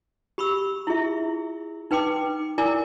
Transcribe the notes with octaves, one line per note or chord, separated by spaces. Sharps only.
G4 B5 C#6 E6
E4 F4 G#4 E5
D#4 B4 G5 C6 D6
E4 A#4 D5 G#5 D6